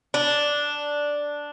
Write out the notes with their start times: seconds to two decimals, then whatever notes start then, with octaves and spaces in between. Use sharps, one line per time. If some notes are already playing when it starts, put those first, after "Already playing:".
0.14 D4